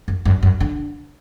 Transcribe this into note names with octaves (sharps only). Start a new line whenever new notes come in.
F#2
F#2
F#2
D3